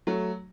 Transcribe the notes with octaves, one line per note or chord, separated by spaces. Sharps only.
F#3 A3